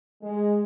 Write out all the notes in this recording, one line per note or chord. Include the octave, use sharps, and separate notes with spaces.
G#3